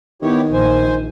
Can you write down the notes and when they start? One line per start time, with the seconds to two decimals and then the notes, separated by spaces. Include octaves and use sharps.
0.22 D#3 B3 E4 G4 C#5
0.53 A#1 C5 G#5